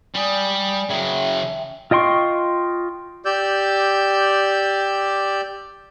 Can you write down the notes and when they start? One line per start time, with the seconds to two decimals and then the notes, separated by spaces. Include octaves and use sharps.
0.15 G3 D5 G#5 D#6
0.89 C#3 F#3 E5 G5
1.91 F4 D#5 G5 C6 C#6
3.25 G4 D5 E6 G6